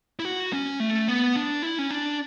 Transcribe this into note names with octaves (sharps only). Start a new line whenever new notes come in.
E4
F#4
C#4
A3
B3
D4
E4
C#4
D4